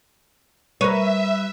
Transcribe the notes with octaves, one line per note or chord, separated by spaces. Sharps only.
G3 A#4 B4 C#5 E5 D#7